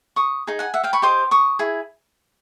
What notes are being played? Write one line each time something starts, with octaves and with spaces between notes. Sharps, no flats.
C#6 D#6
D#4 G#4
F#5 G#5
E5 F#5
F5 G5
B5 C#6
G4 C5 D#5 C6 D6
C#6 D#6
E4 G#4